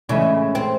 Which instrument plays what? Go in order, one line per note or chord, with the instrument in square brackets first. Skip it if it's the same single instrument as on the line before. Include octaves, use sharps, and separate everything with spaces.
[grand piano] A2 E3 G#3 C#4 E4 [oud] C#3
[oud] C4